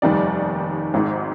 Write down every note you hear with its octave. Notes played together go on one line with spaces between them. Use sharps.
F1 D#2 D#3 G3 D5
G#1 G#2 D#3